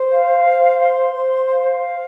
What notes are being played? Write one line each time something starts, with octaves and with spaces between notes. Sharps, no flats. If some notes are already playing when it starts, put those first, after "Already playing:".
Already playing: C5
F5
C5
C6
C5
F5